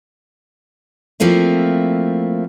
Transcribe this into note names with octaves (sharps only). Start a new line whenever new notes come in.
F3 A3 A#3 C4 E4